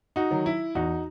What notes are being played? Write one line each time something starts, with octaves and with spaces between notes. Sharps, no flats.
D#4 F#4
D#3 F#3
E4
E2 D#4 F#4